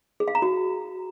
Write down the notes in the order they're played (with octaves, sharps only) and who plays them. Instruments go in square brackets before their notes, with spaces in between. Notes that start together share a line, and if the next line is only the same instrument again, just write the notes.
[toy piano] G#4
F5
A#5
F#4